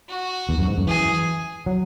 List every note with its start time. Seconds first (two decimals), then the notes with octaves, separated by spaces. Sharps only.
0.09 F#4
0.49 E2
0.58 F#2
0.67 G#2
0.78 F#2
0.87 E3 G#4
1.66 F#3